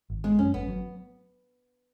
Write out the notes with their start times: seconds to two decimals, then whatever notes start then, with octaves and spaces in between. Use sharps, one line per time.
0.10 G#1
0.24 G#3 B3
0.39 F#2 C#4
0.54 G#1 B3
0.68 F#3